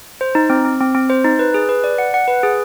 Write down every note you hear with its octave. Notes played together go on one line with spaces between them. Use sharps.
C5
D#4
C4
C4
C4
C4
C5
D#4
B4
G#4
B4
D5
F#5
F#5
B4
G#4